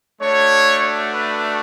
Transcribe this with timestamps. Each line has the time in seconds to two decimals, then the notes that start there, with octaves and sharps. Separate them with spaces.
0.20 A3 D4 F#4 C#5
1.10 B4